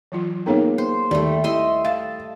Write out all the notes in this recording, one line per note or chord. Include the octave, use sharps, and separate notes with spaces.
E3 F#3 F4
A#3 B3 D#4 G#4 A#4 C#5
C5
D#2 G3 A3 D5
E4 D#5 E5 C6
F5 A5